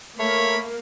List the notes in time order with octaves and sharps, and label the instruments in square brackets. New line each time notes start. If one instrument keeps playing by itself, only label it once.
[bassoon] A3 [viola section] A#3 [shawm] C#5 [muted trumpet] B5